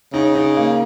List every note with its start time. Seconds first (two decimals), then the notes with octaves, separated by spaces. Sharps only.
0.13 C#3 D#4
0.35 D#4
0.57 A#3